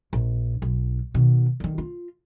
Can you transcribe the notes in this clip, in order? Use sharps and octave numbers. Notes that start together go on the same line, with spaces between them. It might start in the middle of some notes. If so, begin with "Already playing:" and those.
A#1
B1
B2 D#3
D3 D#3
F4